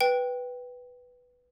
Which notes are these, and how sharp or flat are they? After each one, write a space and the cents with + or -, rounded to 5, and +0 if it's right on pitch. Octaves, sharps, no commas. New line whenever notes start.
B4 +0 G5 +0